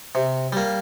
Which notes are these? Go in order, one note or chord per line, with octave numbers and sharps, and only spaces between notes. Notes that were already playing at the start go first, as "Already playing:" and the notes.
C3
G3 A#3